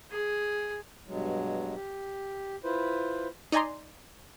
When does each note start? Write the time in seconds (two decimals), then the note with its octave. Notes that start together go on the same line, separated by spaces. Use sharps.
0.12 G#4
1.07 G2 B2 F#3 G#3
1.75 G4
2.64 E4 F4 B4 C5
3.52 D#4 D5 D#5 G#5 A#5 C6